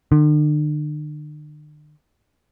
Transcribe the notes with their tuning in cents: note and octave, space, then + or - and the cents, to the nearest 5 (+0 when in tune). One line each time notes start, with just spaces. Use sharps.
D3 +45